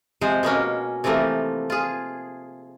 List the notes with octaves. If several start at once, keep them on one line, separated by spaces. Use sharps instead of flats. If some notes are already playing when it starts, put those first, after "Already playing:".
C3 F3 G#3 C5
B2 G#3 A#3 C#4
C3 E3 F3 A3 A#3
F4 G#4